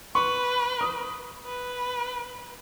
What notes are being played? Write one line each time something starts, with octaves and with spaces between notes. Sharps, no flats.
B4 C#6
D#6
B4